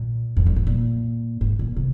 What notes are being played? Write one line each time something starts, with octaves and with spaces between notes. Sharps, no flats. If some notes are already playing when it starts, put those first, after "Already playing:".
Already playing: A#2
F2
G2
G#2
A#2
G#2
A#2
C3